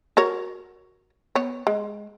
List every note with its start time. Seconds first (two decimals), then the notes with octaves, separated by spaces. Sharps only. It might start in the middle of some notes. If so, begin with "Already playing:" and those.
0.17 F#4 A#4 C#5
1.35 B3 C#5
1.67 G#3